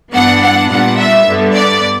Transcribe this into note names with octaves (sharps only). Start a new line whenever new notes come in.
G2 E3 B3 D4 F#5
F#5
A#2 G3 B3 D4 F#5
E5
G2 D3 G3 B3
D5